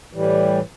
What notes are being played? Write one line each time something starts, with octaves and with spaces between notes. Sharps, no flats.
A2 E3 G3